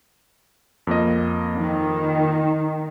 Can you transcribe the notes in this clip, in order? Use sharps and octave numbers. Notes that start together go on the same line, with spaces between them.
F2 A#3 D#5
D#3